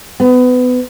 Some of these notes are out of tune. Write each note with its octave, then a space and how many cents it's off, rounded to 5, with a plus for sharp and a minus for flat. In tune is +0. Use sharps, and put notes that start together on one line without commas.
B3 +25